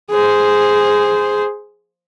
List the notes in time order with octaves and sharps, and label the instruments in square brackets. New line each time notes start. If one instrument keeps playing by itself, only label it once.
[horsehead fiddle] G#4 C5